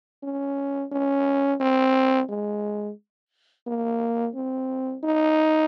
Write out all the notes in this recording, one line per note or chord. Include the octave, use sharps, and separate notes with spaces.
C#4
C#4
C4
G#3
A#3
C4
D#4